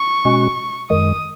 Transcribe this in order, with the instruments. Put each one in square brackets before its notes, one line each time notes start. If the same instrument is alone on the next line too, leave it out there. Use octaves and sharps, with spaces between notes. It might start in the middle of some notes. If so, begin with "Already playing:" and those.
Already playing: [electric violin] C#6
[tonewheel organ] B2 G#3 C#4 F#4
[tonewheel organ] F#2 D#3 G#3 [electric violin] D#6